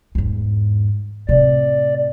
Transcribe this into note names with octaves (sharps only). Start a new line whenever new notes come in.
E2 G#2
A2 C3 D5